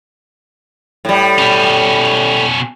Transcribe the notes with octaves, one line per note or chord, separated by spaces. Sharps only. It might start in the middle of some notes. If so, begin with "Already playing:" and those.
A2 G3
B2 C#4